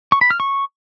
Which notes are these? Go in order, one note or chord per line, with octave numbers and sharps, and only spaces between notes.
C#6
B5
F6
C#6